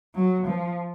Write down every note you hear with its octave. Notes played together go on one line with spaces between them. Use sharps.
F#3
F3